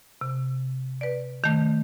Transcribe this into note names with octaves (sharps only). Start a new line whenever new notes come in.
C3
B4 D5
D#3 A3